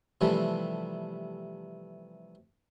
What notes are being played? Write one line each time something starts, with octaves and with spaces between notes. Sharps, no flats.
C3 E3 F3 G3 A3